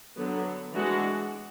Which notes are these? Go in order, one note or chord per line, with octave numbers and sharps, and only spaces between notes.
D3 F#3 B3
E3 G#3 D4 F#4